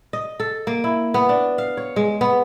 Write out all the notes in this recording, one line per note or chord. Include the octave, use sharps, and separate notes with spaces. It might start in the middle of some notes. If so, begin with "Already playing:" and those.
D#5
A4
A#3
E4
B3
D4
F5
C#5
G#3
B3